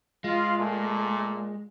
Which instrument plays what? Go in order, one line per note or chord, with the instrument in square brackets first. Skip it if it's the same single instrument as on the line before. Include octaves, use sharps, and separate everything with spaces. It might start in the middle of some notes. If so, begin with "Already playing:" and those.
[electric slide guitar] G#3 [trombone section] F4
[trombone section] A#2 A3